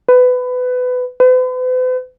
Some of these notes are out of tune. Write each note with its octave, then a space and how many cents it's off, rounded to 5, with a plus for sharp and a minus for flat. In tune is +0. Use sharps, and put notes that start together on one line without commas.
B4 +20
B4 +45